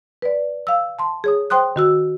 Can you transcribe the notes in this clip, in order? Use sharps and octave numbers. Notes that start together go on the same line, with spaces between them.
B4 D5
F5 E6
A5 C6
G#4 C#5 D#6
C5 G5 C6 D#6 F#6
D#3 F#4 E6